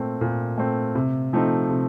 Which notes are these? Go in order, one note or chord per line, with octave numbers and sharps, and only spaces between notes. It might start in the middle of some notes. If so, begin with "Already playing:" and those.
Already playing: A#2 A3 C4
A#2
A3 C4
C3
F3 A3 C4 D#4
C3